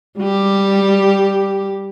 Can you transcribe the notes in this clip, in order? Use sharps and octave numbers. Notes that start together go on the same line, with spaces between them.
G3 G4